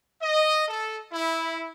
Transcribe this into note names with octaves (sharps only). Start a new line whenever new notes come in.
D#5
A4
E4